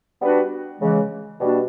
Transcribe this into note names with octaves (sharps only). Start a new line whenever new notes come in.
G3 B3 D4 F#4 B4
C#3 E3 G#3
B2 G3 A#3 D4 F#4